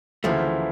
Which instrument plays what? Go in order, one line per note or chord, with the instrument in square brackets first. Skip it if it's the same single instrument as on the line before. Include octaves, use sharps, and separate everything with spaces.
[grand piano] D2 C#3 E3 A#3 E4 [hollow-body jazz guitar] F3 A3